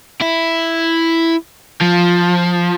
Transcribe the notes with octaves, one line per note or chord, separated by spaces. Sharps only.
E4
F3